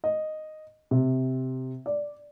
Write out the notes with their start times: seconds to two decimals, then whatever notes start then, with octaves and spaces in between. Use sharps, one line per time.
0.04 D#5
0.91 C3
1.86 D5